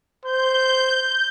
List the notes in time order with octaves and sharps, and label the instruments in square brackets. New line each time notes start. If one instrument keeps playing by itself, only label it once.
[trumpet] C5 [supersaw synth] G6